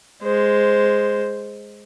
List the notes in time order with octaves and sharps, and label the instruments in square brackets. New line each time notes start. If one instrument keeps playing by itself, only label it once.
[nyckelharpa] G#3 C5